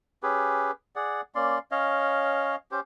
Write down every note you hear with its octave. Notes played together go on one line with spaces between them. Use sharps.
C#4 G4 G#4 B4
G#4 D5 F#5
A#3 C#4 D5 C6
C#4 C#5 D#5 F5
C#4 G4 C5